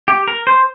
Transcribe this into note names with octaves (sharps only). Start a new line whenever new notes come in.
G4
A#4
C5